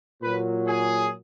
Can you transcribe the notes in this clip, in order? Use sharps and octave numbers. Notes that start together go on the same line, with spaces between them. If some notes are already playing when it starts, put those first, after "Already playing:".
A#2 F#3 B4
G#4